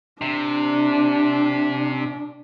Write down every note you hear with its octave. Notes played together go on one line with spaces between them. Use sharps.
C3 D4